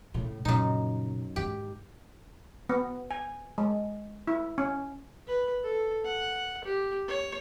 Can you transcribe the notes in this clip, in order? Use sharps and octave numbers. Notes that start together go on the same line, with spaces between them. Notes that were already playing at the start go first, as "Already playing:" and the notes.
A2 C#3
F#2 A#2 C#3 D#4
G#2 D#3 G4
B3
G#5
G#3
E4
C#4
B4
A4
F#5
G4
C#5